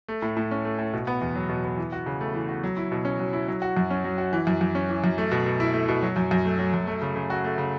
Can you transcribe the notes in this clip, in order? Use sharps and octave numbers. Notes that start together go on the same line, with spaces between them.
A3
A2
A2
C#4
A3
A2
B2
B3
E2
F#3
B2
B3
E3
F#4
C#3
A3
E3
F#4
F#3
E4
B2
C#4
F#3
E4
F#3
F#4
F#2
C#4
F#3
F#4
E3
F#2
F#2
C#4
E3
F#2
A3
B2
B2
E4
A3
B2
F#3
F#2
F#2
A3
F#3
F#2
A3
C#3
C#3
F#4
A3
C#3